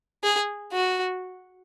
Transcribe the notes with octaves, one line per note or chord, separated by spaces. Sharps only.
G#4
F#4